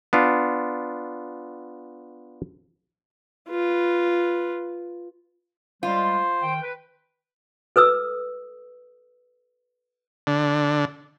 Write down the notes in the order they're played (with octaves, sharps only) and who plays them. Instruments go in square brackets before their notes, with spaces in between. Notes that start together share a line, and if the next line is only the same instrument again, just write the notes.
[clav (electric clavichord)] B3 D4 F4
[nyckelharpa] F4 B4
[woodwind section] G3 G#3 [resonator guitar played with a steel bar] F4 [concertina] C5
[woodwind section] D#3 G5
B4
[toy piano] A4 B4 D#6 E6
[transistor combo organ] D3